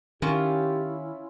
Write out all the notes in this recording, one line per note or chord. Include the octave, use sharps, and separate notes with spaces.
D#3 C#4 E4 F4 G4